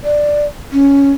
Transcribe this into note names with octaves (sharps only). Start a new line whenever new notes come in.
D5
C#4